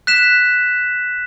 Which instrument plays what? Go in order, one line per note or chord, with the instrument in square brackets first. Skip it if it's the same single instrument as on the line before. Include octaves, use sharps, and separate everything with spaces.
[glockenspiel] F#6 B6 E7